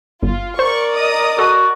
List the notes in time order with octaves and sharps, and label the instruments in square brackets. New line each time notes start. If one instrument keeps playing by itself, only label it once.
[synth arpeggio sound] G1 [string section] F4
[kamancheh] A#4 D5 [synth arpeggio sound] C5 [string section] C#6
[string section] D#5 A#5 D#6
[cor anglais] F#4 [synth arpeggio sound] A4